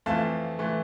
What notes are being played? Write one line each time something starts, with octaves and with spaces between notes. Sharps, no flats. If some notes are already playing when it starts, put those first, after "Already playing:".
F2 E3 A3 F5 A5
E3 A3